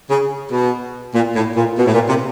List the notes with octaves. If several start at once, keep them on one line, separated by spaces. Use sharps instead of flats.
C#3
B2
A#2
A2
A#2
B2
A2
A#2
C3